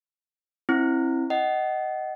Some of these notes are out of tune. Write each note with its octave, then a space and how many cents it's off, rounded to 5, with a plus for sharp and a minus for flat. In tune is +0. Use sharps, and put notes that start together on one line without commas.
C4 +30 E4 +0
D#5 +0 F#5 +30